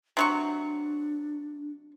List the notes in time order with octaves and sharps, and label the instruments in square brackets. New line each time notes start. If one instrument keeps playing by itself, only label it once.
[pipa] C3 F#3 C#6 [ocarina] D4